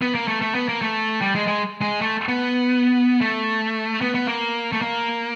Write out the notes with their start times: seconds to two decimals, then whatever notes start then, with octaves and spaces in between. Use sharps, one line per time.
0.02 B3
0.15 A#3
0.28 A3
0.41 A3
0.55 B3
0.68 A#3
0.82 A3
1.22 G3
1.35 G#3
1.47 G#3
1.81 G#3
2.01 A3
2.29 B3
3.21 A3
4.01 B3
4.15 B3
4.28 A#3
4.72 A3
4.81 A#3